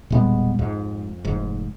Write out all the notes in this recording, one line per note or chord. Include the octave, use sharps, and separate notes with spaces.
E1 A#2 G3 G#3 B3 D4
F2 G#2
F1 G#2